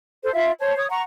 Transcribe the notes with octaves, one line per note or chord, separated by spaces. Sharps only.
A4 C5
F4 E5 F5
C5 C#5 A5
C#5 D#6
F#5 A#5 C#6